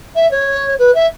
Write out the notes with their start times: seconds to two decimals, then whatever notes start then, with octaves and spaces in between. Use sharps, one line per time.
0.15 E5
0.31 C#5
0.78 B4
0.94 E5